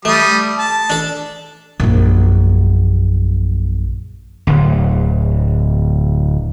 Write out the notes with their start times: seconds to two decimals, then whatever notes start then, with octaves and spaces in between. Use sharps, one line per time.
0.05 G3 A3 D#6
0.59 A5
0.90 D4 A4
1.80 A#1 F#2
4.47 D1 D2